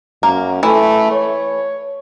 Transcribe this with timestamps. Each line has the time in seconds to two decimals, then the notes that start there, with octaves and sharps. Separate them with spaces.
0.23 F#2 A#3
0.63 E3 A3
1.12 C#5